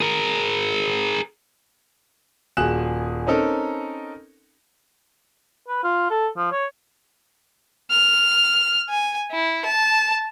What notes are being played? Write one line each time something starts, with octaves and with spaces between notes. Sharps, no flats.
G#4 A#4
D#1 F#4 G#4 F#6 E7
C4 C#4 D#4 A4 A#4
B4
F4
A4
F3
C#5
F6
G#5
E4
A5